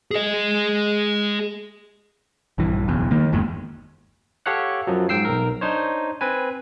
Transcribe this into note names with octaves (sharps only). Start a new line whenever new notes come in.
G#4 D#5
A#1 G2 E3
F#1 B1 E2
D#3 A#3
G1 E2 G#2
G4 A4 C#5 F5 F#5 F#6
F#2 F3 F#3
G#2 G5 E6 C7
B1 A#4
D4 D#4 C5 C#5
C4 B4 G#5